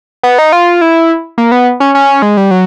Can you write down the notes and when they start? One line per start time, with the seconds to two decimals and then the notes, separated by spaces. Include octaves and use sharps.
0.23 B3
0.38 D#4
0.52 F4
0.81 E4
1.38 A#3
1.52 B3
1.80 C#4
1.95 C#4
2.22 G#3
2.37 G3
2.51 F#3